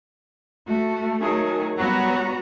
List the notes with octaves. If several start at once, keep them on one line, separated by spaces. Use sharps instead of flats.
A3 F#4
D#3 F#3 G#4
F#3 G3 B3 F#4 A#5